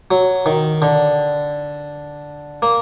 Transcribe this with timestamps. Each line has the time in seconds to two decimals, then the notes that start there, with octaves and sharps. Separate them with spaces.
0.11 F#3
0.46 D#3
0.82 D3
2.62 A#3